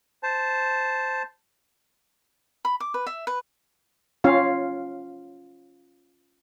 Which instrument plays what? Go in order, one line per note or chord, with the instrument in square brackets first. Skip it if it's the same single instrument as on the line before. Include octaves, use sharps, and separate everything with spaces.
[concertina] C5 A5
[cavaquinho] B5
D6
B4
E5
B4
[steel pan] C#4 F4 F5